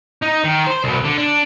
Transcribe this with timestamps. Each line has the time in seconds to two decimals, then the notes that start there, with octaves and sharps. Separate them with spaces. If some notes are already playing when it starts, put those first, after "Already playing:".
0.23 D#4
0.45 D#3
0.67 C5
0.84 C2 B2
1.04 D3
1.18 D4